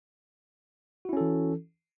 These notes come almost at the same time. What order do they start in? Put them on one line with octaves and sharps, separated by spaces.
F#4 E4 C#4 A4 E3